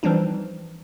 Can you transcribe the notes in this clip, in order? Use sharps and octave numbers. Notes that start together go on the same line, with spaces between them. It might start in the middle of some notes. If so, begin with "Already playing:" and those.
E3 F3 G3 C4 D4 D#4